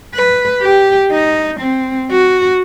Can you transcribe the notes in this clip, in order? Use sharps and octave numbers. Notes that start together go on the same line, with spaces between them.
B4
G4
D#4
C4
F#4